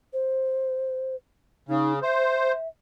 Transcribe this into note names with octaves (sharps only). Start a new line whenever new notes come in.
C5
C#3 D#4
C5 E5